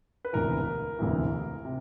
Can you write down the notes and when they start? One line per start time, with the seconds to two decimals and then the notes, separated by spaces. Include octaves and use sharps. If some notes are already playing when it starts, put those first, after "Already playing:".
0.25 B4
0.33 E1 D2 C3 E3 A#4
0.99 E1 D2 C3 E3
1.65 C3